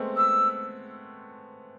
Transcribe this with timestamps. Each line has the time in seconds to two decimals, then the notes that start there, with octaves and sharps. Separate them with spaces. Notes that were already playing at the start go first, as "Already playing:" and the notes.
Already playing: G#3 A3 B3 C4
0.16 E6